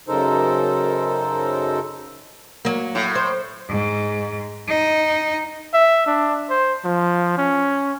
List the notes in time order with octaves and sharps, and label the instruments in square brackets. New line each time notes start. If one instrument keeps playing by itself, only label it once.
[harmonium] F#2 C#3 D#4 A4 A#4 C5
[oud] F#3 A#3
[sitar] A2
[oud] C5
[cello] G#2
D#4
[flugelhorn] E5
D4
C5
F3
C#4